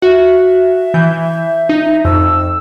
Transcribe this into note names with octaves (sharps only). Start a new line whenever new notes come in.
F#4 E5
E3 G6
D#4
F2 E6